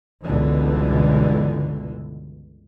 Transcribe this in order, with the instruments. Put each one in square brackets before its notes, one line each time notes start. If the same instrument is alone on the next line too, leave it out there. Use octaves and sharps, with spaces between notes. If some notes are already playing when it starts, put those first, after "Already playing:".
[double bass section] G1 C#2 B2 D3 E3